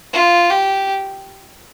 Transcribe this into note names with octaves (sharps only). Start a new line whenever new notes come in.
F4
G4